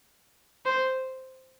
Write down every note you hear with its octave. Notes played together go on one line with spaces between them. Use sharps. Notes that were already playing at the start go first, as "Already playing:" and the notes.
C5